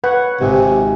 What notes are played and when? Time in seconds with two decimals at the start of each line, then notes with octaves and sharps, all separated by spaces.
0.04 B4 C#5 F#5
0.41 G#1 C3